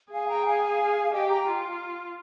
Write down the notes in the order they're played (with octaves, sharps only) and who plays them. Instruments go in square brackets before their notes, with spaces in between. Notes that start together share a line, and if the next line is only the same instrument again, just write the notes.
[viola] G#4 [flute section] F5 G#5
[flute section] G5 A#5
F5 G#5
[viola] G4 [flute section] D#5 G5
[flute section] G5 A#5
[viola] F4